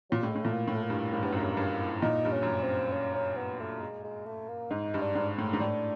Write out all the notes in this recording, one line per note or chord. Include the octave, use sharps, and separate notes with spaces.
A#2 F#3
A2 G3
G#3
A2
A#2 A3
A#3
A2
A3
A#3
G2
G#2 A#3
G2 B3
F#2 A#3
G2
G2
A#2 D#4
G2
C#4
F#2
G2
C4
C#4
C#4
B3
A3
G#3
G#3
A3
A#3
G#2 D#4
G2
D4
G#2
A2
G#2
A2 D4